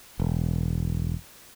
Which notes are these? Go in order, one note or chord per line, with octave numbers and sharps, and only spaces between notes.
E1